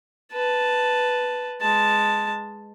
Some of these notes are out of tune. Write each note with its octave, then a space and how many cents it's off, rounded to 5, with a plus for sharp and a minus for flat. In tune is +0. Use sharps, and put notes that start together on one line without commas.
B4 +0 A5 +0
G#3 +0 A5 +0